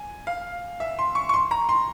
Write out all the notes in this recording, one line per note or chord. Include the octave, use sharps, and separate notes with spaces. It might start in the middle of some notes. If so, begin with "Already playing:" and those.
Already playing: G#5
F5
E5
C6
C#6
C#6
C6
A#5
C6